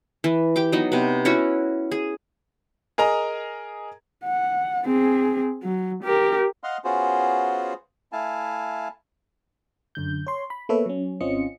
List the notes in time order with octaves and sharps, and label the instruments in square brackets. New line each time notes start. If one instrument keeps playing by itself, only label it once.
[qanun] E3
G4 G5 D6
F#3 B3 D#4
C3 B3
C#4 E4 F#4 C#5
G#4
[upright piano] G#4 A#4 D#5 A#5
[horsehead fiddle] F#5
C4 G#4
F#3
G4 A#4
[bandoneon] D#5 F5 F#5 C6 F6
B3 C#4 F4 F#4 G#4 C5
A3 E4 F5 G#5 A5
[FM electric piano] F#2 D3 G6
C#5 C6
B5
A#3 B3 A4 B4 C#5 E5
F#3 C#4
G#1 C4 C#4 F4 D#5 C#7